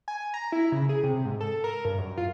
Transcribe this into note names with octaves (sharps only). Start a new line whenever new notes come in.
G#5
A#5
E4
C#3
G#4
C3
G#2
A4
A#4
G2
F#2
F4